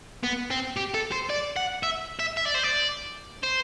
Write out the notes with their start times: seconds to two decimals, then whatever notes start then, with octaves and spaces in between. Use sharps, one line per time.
0.24 B3
0.51 C4
0.77 G4
0.94 A4
1.12 C5
1.30 D5
1.57 F#5
1.83 E5
2.19 E5
2.37 E5
2.45 D5
2.54 C5
2.64 D5
3.43 C5